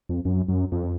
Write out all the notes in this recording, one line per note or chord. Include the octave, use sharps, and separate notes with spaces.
F2
F#2
F#2
F2